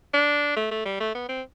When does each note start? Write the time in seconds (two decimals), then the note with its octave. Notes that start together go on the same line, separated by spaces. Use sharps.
0.13 D4
0.57 A3
0.71 A3
0.85 G3
1.00 A3
1.15 B3
1.29 C4